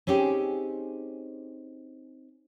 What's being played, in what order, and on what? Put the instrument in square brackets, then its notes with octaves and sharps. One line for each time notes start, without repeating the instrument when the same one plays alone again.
[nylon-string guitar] C4 C#4 D#4 G4 G#4